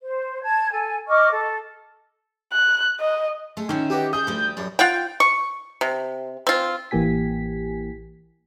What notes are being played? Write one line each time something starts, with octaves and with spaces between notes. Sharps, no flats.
C5
A5 G#6
A4 G#5
D#5 C#6 D6 F6
A4
F#6
D#5
G#3 A3
D#3 E3 C#4 E5
D#4 F#4 G4 B4
G#4 D#6 G6
D2 F3 G3
F#2 A2 G3
F4 F#5 G5
C#6
C3
C4 F4
A1 E3 A#3 G4 G#5 B6